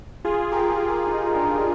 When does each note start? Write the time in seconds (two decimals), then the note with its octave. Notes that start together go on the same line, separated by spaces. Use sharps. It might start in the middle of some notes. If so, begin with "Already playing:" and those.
0.25 F4 G#4
0.41 G#4
0.52 G4 A#4
0.80 F4 G#4
1.07 D#4 G4
1.35 D4 F4